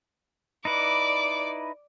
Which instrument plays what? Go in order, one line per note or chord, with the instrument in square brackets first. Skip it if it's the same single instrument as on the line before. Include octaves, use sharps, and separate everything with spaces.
[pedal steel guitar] D#4 E4 B4 [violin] D5 D6